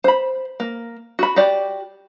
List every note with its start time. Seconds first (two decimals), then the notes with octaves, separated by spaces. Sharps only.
0.04 C5 B5
0.60 A#3
1.19 F#4 B5
1.36 F#4 G4 D5